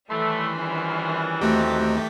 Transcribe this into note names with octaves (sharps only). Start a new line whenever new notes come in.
A2 D#3 E3 G3 A3 B5 C6
A#1 E2 C#4
D#2 A3 C4 F#4 G4 D#5 A#5